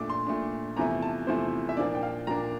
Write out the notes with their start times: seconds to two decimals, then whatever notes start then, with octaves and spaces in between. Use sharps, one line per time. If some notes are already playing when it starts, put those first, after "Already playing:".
Already playing: A#2 A3 D4 D6
0.10 C6
0.27 A#2 A3 D4
0.77 E2 C3 F3 A3 E4 A#5
1.02 A5
1.27 E2 C3 F3 A3 E4 C5
1.69 E5
1.77 A#2 F3 A#3 D4 D5
1.95 G5
2.03 F5
2.27 A#2 F3 A#3 D4 A#5